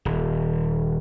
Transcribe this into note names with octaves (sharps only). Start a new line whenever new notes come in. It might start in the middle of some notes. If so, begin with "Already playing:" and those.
D#1